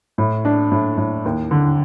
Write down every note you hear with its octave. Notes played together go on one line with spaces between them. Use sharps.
A2
D4
A2
A2
D#2
D3